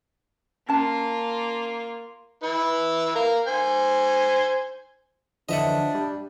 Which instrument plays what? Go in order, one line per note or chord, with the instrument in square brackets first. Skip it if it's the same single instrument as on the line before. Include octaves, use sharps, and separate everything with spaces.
[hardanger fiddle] A#3 F4 [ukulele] C#4 A5
[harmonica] E4 B4
A#4 F5
C5 G#5
[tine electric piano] D3 E3 F3 [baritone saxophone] D4 [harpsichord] D#5 E5 F#5
[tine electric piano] G3